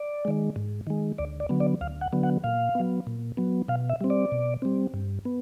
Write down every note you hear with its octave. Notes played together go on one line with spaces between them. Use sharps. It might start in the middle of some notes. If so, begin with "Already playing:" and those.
Already playing: D5
D#3 G#3
G#2
D#3 G#3
D2 D5
D5
D3 F#3 B3
D5
D2 F5
F#5
D3 F#3 B3
F#5
A#2 F5
F#3 B3
A#2
F#3 B3
B2 F5
E5
G3 C4
D5
B2
G3 C4
G2
B3